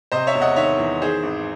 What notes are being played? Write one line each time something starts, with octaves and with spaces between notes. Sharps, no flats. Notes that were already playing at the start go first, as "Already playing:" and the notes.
C3 C5 D#5
C#5 E5
E1
D#5 F#5
D#3 C#5 E5
E2
D#3 G#4 C5
G#1